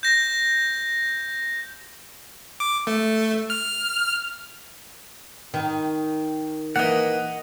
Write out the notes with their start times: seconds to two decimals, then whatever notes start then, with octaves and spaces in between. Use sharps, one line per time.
0.03 G6 A#6
2.60 D6
2.87 A3
3.50 F6
5.54 D#3
6.76 E3 A#3 D#5 F#5